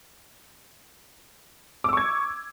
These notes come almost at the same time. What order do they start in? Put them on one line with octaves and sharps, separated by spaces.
D6 E6 C#6 G#6